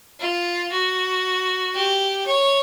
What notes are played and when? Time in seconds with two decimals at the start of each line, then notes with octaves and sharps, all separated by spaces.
0.21 F4
0.72 F#4
1.75 G4
2.26 C#5